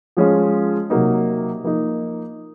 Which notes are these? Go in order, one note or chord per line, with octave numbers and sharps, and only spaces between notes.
F3 G#3 C#4 F4
C3 F#3 A#3 D#4
F3 A#3 D#4